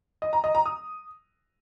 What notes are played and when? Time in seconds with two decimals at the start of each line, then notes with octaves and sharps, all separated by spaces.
0.22 D#5
0.33 A#5
0.44 D#5
0.55 A#5
0.66 D#6